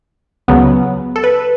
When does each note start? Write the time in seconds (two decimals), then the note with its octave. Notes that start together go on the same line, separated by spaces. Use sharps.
0.48 C#2 C#3 F#3 B3
1.16 A4
1.24 B4